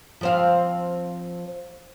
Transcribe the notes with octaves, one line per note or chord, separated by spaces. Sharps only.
F3 C4 F5